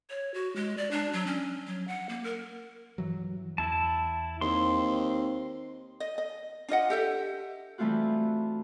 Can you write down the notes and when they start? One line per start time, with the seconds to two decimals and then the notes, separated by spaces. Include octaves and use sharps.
0.10 C#5
0.34 F#4
0.56 G#3
0.77 D5
0.91 D4
1.13 F#3
1.27 C#4
1.67 F#3
1.88 F#5
2.09 A#3
2.24 A#4
2.98 G2 E3 F#3
3.58 E2 E4 A5
4.41 D#2 C4 C6
6.00 D#5
6.18 D#5
6.68 D4 F4 D#5 F#5
6.90 G4 A4 E5
7.78 E3 G3 A3 C4 F4 F#4